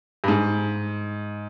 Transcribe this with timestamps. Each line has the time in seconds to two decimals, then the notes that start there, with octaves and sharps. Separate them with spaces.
0.24 G2
0.28 G#2